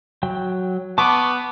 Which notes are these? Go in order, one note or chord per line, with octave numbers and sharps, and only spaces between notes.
F#3 G5
B3 A5 C#6 D6